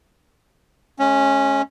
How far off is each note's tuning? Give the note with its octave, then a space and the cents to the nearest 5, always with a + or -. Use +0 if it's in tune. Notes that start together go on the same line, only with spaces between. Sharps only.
G#3 +35 C#4 -5